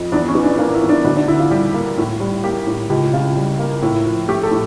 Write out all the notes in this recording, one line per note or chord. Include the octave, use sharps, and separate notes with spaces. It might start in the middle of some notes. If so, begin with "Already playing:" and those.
Already playing: F2
E2 D4
C#4
E3
D4
A#3 D4
E4
E2
D4
D2 D4
D4
D3 E4
F4
G3 G4
A#3
A2
G3
A#3 G4
A2
C#2 G4
C#3 F4
G3
A#3
A2 E4
F3
A3 G4
A4
A2